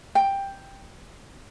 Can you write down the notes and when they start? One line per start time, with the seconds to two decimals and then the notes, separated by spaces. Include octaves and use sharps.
0.15 G5